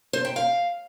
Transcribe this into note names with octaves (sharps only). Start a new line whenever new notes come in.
C5
G5
F5